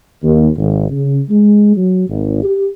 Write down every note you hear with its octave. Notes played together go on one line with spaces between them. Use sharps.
D#2
G#1
C#3
G#3
F#3
G#1
G4